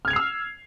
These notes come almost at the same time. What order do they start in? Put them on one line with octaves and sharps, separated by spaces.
F6 G#6 F7 C7 E6